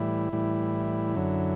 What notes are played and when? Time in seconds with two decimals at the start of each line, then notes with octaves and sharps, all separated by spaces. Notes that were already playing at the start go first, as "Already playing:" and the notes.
Already playing: A2 E3 G3 E4
0.33 A2 E3 G3
1.15 F#2 D3 F#3